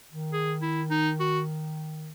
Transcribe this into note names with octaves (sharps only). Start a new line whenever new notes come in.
D#3
G#4
E4
D#4
F#4